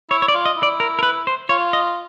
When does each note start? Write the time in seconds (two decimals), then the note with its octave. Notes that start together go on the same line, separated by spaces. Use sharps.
0.10 E4 C#5
0.22 C#5
0.28 D5
0.34 F4
0.45 D#5
0.57 E4
0.63 D5
0.80 A#4
0.99 A#4
1.03 B4
1.27 C5
1.49 F4 C#5
1.73 D#5